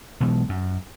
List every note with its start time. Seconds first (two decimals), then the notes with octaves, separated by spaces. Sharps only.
0.20 B1 B2 E3 G#3
0.49 F#2